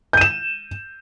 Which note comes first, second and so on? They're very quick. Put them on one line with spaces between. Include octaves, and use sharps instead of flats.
G6 D#7 E7